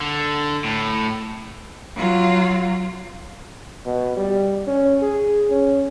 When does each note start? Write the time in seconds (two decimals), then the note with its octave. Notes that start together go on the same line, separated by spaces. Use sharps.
0.01 D3
0.64 A2
1.96 F#3 F4
3.86 B2
4.17 G3
4.67 C#4
5.02 G#4
5.50 C#4